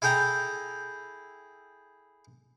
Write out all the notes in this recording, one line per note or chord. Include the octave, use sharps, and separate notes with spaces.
E4 G#4 A4 G5 A#5